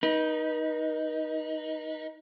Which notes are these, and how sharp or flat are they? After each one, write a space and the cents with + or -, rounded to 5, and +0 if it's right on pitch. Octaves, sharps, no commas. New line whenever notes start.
D#4 +0 B4 -40